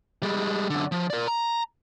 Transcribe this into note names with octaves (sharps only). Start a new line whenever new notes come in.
G3 G#3
F#2 D3
F3
A#4 D5
A#5